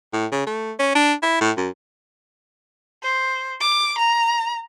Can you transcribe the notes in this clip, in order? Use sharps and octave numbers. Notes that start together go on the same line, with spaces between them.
A2
C#3
A3
C#4
D4
E4
A2
F#2
C5
D6
A#5